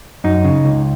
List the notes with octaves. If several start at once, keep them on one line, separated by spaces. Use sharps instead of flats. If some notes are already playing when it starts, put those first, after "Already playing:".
F#2 D#4
C#3
C#2